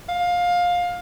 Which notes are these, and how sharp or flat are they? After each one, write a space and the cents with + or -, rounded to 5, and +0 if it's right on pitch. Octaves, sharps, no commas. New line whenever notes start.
F5 +20